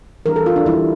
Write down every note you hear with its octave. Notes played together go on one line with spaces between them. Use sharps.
E3 G3 D4 A#4
A4
F4
D4
E3 G3 D4 E4